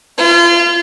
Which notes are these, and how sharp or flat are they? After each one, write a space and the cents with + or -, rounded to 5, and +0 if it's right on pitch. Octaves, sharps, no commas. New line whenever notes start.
F4 -30